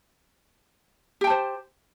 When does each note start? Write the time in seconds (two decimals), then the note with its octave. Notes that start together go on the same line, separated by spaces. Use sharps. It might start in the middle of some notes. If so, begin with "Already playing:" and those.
1.21 G4
1.24 G5
1.27 A5
1.30 C5